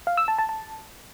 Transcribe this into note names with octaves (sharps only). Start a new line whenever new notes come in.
F5
E6
A5
A5
A5